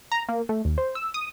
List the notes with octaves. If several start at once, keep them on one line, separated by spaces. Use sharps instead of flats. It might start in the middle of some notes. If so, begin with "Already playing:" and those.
A#5
A#3
A3
D#2
C5
E6
D#6